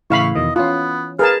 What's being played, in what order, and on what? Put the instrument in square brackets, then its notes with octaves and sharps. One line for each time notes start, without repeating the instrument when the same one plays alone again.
[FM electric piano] A2 C#3 E3 [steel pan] E4 F5 B5 [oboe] C#6
[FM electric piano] E2 B2 D#3 [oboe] D#5
[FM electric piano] E3 C#4 [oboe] B3 [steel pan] F4
[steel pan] G#4 A#4 A5 [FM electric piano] B4 [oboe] F5